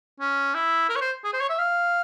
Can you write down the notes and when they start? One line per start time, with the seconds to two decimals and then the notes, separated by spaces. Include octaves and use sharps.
0.20 C#4
0.54 E4
0.89 A#4
0.96 C#5
1.01 C5
1.25 G#4
1.33 C5
1.41 C#5
1.49 E5
1.59 F5